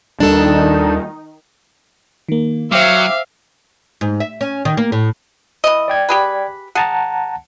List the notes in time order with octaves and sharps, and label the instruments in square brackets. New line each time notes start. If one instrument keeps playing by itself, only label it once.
[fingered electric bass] D#2 G3 [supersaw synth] D#3 D#4 [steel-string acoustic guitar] D4 A4
[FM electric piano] D#3 A#3
[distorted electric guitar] F#3 [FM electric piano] C5 G5 D6 [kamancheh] E5 [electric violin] F5
[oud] G#2
E5
C#4
D#3
A#3
A2
[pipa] E3 D#5
[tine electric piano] D5 G5 G#6
[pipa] G4 G#4 B4
[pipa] G#4 [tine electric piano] F#5 A5 A#5